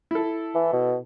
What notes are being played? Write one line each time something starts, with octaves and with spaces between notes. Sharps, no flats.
E4 A4
E3
B2